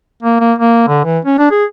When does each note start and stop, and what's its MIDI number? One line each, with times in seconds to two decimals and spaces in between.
0.23 0.38 58
0.40 0.53 58
0.58 0.83 58
0.88 1.01 50
1.05 1.19 52
1.25 1.38 61
1.38 1.50 62
1.51 1.64 68